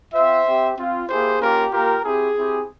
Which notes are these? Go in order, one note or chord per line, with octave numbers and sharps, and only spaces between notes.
C4 F4 C5 E5
C4 G4
C4 F4
A#3 E4 G4 G#4 C5
A#3 C#4 F4 G4 A#4
A#3 F4 G4 A#4
C4 E4 G4 G#4
C4 E4 G4